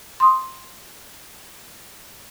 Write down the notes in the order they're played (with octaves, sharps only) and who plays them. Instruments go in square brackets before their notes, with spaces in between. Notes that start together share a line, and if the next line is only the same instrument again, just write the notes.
[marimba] C6 D#6